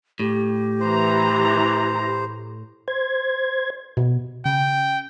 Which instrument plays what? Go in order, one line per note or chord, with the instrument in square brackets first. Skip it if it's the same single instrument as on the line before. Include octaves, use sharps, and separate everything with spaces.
[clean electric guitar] A2 [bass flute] G4
[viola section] E3 A#5 [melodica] C5
[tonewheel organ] C5 G#6
[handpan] B2
[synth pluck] C#3 [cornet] G5